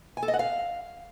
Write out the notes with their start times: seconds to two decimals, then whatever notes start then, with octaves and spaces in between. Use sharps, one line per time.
0.17 G#5
0.23 A4
0.28 D#5
0.34 F#5
0.39 F5